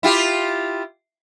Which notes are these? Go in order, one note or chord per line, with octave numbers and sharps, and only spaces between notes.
E4 F4 G4